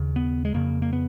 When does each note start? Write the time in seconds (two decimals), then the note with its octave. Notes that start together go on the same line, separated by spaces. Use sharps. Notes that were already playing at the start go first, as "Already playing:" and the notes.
Already playing: D#2 C#3
0.16 B3
0.45 G#3
0.54 F2 C#3 A#3
0.82 A#3
0.93 B3